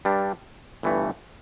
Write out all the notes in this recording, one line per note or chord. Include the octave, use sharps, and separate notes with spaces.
G2 G3 D4
G1 G2 E3 A3